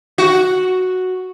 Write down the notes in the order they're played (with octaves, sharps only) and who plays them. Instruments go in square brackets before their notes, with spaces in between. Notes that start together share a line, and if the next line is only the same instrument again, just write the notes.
[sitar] F#4